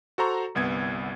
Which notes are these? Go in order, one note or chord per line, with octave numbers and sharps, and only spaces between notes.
F#4 A4 C5 A#5 C#6
G1 C2 B3 G#6